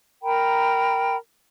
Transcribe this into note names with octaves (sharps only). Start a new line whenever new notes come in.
A#4 G5 A#5 B5